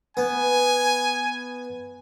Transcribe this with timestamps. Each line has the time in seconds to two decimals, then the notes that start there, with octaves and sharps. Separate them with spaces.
0.17 B3 G#5